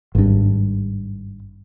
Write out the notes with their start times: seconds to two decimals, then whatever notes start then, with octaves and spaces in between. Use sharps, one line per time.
0.15 G#1 G2